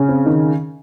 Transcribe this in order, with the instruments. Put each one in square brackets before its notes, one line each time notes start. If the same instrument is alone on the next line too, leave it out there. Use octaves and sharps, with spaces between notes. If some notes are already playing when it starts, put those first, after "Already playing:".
Already playing: [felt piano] C#3 C#4
[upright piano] C4
D#3